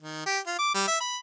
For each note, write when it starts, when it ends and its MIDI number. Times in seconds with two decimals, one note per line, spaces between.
0.01 0.21 51
0.26 0.39 67
0.47 0.55 65
0.58 0.74 86
0.75 0.87 55
0.88 0.98 76
1.00 1.17 83